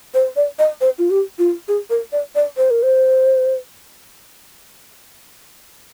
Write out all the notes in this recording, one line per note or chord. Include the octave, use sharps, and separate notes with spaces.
C5
D5
D#5
C5
F4
G4
F4
G#4
A#4
D5
D5
C5
A#4
C5